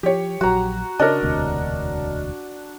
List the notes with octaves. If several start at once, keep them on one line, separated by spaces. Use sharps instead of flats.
F3 G4 C#5
A#1 F#3 F#4 A#5
C#3 D4 A#4 C#5 D#5
E1 D2 C3